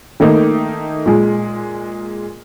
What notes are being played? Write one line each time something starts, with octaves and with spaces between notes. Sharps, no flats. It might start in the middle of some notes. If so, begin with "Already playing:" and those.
D#3 A3 A#3 D#4
A#2 G#3